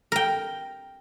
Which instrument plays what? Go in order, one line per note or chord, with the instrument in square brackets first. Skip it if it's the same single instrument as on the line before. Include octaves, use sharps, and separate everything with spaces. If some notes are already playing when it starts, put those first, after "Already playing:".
[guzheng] A#4 G5